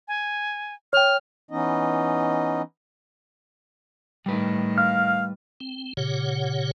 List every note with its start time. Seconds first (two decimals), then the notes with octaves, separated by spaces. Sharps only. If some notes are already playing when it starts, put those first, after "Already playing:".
0.08 G#5
0.93 C#5 G5 F6
1.51 E3 B3 C#4 D#4 D#5
4.26 A2 D#3 G3 B4
4.78 F5 F6
5.60 C4
5.97 A#2 C#3 G4 C#5 F#5